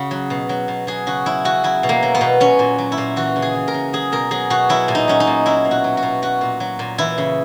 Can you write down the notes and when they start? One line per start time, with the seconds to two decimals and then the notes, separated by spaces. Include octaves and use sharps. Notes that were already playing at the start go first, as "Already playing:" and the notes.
Already playing: C#3 F#4
0.11 F#3
0.30 B2
0.49 F#3
0.68 B2
0.87 F#3 G#4
1.07 C#3 F#4
1.26 F#3 E4
1.45 C#3 F#4
1.64 F#3 E4
1.83 B2
1.89 A#3
2.03 F#3
2.15 B3
2.21 B2
2.40 F#3 C#4
2.59 A#2
2.78 F#3
2.92 E4
2.98 A#2
3.16 E3 F#4
3.36 C#3
3.42 G#4
3.54 E3
3.68 A#4
3.74 C#3
3.93 F#3 G#4
4.12 B2 A#4
4.31 F#3 G#4
4.50 B2 F#4
4.69 F#3 E4
4.88 A#2
4.95 D#4
5.08 F#3 C#4
5.20 D#4
5.27 A#2
5.46 F#3 E4
5.65 B2
5.71 F#4
5.84 F#3
5.97 F#4
6.03 B2
6.22 F#3 F#4
6.41 A#2
6.60 F#3
6.79 A#2
6.98 E3 E4
7.18 C#3